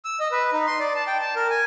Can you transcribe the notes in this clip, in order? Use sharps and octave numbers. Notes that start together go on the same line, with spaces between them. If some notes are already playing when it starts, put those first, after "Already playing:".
E6
D#5
B4
D#4
C6
D5
A5
G5
A5
A#4
G#5